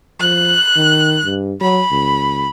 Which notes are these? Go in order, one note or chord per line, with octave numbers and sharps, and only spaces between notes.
F3 F#6
D#3
G2
F#3 B5
C#2